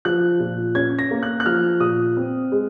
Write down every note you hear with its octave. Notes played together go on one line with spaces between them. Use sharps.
F3 F#6
A#2
C#4 G#6
A#6
A#3
F#6
F#6
F3 F6
A#2 D#6
C4
G#3